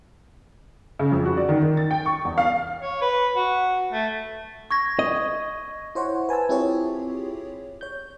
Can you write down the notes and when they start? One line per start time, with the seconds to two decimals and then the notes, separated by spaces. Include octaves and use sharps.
0.99 C#3
1.12 F2
1.25 F#4
1.37 D5
1.49 D#3
1.62 D#3
1.77 A6
1.91 G5
2.06 C#6
2.25 E2
2.38 F5
2.82 C#5
3.02 B4
3.35 F#4
3.93 A3
4.71 C#6 G#6 A#6
4.99 D#5
5.95 E4 C5 C#5 F#5
6.29 B4 G#5 A5 E6
6.49 C4 E4 F4 G4 G#4 C#5
7.81 C#5 G6